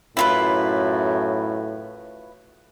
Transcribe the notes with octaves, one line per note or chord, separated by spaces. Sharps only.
F#2 A2 E4 F4 B4